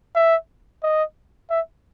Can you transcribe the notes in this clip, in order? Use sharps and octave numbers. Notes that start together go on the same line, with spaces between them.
E5
D#5
E5